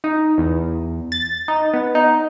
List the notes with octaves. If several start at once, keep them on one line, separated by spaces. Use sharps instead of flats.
D#4
E2
A6
D#4
B3
D#4